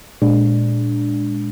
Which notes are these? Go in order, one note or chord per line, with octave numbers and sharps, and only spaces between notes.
A#2 G#3 D4